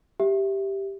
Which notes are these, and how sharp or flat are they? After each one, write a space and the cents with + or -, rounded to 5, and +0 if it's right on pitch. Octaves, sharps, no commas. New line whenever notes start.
G4 +0 E5 +0